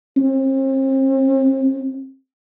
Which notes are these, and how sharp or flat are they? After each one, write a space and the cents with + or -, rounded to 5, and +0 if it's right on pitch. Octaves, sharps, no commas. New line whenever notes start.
C4 +40